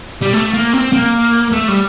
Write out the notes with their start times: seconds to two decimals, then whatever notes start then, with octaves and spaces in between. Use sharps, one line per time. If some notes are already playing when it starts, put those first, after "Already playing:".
0.22 G3
0.34 A3
0.54 A#3
0.74 C4
0.92 A#3
1.52 A3
1.68 G3